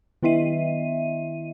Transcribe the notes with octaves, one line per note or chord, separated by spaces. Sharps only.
D#3 B3 E4 D#5 E5 D#7